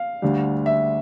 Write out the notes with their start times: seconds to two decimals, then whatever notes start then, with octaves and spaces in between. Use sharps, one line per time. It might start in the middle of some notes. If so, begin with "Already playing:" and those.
Already playing: F5
0.22 D2 D3 G3
0.66 E5